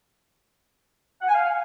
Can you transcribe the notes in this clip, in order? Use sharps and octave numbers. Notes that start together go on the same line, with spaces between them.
F#5
G#5
F5